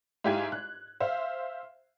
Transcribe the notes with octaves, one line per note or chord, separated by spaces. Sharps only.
G#2 E4 G4 F5 G#5 G#6
F#6
C5 E5 F5